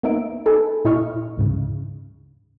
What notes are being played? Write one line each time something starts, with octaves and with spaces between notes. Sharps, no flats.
A#3 B3 D#4 E5 D7
D#4 A4 B4 G#5
A#2 E4 D#5 C#6 F6
D2 G#2 C#3